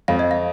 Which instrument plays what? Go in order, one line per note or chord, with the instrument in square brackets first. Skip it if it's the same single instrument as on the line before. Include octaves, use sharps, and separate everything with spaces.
[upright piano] F2 [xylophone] F5
[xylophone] D#5
F5